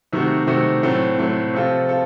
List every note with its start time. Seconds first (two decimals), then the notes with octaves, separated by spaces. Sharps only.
0.13 C3 D#3 A3 C4 F#4
0.47 C3 D#3 A3 C4 F#4
0.83 A2 F#3 A3 C4
1.18 A2 F#3 A3 C4
1.54 C3 F3 C4 F4 A4
1.89 F4 A4